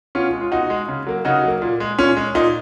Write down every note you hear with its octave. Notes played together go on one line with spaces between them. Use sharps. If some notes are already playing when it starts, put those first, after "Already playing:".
B2 C#4 F4
G#3
F4
B2 D#4 F#4
G#3
C#3
F#3 A#3
C#3 D#4 F#4
F#3 A#3
A#2
G#3
A#2 C#4
G#3
A#2 D#4